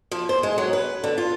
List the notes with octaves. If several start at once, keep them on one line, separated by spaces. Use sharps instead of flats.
F3
C5
G#3
F#3
B4
D3
F4